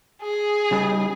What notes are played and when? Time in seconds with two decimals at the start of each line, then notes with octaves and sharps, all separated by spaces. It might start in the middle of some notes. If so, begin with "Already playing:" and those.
0.22 G#4
0.71 C#3 G3 D#4